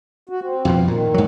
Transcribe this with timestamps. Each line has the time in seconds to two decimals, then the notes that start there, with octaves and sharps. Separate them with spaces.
0.29 F#4
0.42 C4
0.65 F2 B2 F3
0.88 A#2 D#3
1.14 G#2 F#3